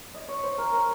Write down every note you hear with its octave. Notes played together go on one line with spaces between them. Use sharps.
D#5
C#5
C5
A#4
A#4